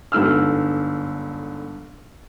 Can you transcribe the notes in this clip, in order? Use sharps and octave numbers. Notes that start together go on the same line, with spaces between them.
G1 G#2 D3 E6 F6